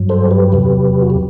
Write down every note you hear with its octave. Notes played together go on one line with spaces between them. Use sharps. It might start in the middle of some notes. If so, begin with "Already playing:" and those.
Already playing: G2 F#3
A4 C5
G4 B4
E2 C3 F#3
F#4
G4